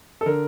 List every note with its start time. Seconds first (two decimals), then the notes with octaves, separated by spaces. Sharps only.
0.21 A4
0.26 D3 A#4